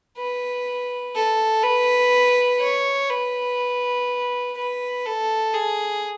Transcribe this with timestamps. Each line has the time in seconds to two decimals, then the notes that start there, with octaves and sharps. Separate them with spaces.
0.17 B4
1.15 A4
1.63 B4
2.60 C#5
3.10 B4
4.57 B4
5.06 A4
5.54 G#4